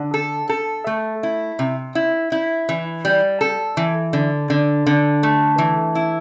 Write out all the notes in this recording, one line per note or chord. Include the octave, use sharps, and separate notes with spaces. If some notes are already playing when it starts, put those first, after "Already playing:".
Already playing: D3
A4
A4
A3
E4
C3
E4
E4
E3
G3
A4
E3
D3
D3
D3
A3
E3
E4